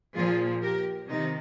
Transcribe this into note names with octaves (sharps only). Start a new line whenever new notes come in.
A#2 F3 F4 G#4
G4 A#4
C3 D#3 D#4